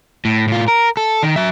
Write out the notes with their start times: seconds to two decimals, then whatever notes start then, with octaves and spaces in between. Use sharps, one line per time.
0.25 A2
0.48 A2 F4
0.68 A#4
0.97 A4
1.23 D#3
1.36 F#3 E5